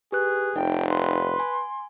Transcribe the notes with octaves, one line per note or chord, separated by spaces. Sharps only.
G4 G#4 B4 F#6
F1 D#4 G5
B4 C6
G#5